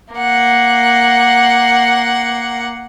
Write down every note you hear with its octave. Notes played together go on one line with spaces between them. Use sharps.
A#3 F#5